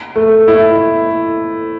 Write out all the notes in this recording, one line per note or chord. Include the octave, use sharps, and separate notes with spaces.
A3
E4